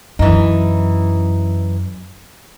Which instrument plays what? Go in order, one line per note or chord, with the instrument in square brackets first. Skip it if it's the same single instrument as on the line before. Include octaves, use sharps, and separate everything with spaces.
[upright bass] F#2 [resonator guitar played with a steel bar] E3 D#4